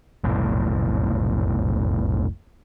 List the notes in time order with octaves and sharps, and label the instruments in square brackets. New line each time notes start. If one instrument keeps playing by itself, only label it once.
[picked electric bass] F1 B1 A2